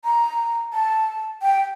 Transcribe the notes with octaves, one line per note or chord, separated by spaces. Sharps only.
A#5
A5
G5